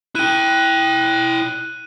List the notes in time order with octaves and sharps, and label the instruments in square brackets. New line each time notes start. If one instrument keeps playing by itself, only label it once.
[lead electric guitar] E4 G5 [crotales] F#6 D#7